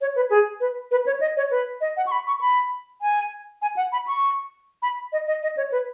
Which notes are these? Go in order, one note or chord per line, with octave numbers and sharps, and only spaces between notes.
C#5
B4
G#4
B4
B4
C#5
D#5
C#5
B4
D#5
F#5
C#6
B5
C#6
B5
G#5
G#5
F#5
B5
C#6
B5
D#5
D#5
D#5
C#5
B4